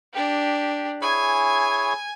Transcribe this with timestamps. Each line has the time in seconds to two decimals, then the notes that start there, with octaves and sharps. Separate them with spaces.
0.13 D4 G4
1.02 E4 G#4 C#5 G#5